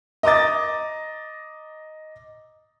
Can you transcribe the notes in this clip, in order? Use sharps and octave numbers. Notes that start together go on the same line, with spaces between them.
D#5 A#5 D6 D#6 A6